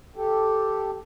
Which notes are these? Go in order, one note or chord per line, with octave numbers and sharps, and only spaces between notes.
G4 A4